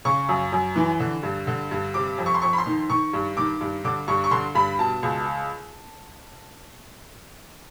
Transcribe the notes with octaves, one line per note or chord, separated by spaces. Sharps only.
C#3 C#6
F#2
F#2
E3
D3
G2
D3
G2
C3 D6
F2
C#6
C6
F2 C#6
B5
C6
D#3
D#3 C#6
G2
D#3 D6
G2
D3 D6
G2 C#6
C#6
D3 C6
G2 B5
B2 A5
C#2